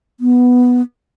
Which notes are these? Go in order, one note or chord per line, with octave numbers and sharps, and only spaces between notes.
B3